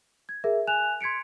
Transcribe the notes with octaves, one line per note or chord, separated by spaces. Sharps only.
G#6
G#4 A#4 E5
G#5 F#6 E7 F7
C6 G#6 B6 C#7 D7